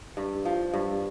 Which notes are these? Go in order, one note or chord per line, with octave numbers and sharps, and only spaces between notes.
G2
F3
G2